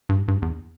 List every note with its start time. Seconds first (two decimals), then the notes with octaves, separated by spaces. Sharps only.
0.09 G2
0.28 G2
0.42 E2